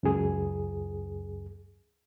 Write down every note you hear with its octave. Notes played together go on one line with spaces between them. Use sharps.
C#2 F#2 G#4